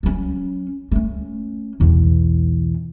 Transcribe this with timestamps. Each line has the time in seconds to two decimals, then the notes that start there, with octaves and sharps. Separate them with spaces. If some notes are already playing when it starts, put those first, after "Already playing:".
0.03 F#3 C#4
0.92 A3 C#4
1.80 B1 E2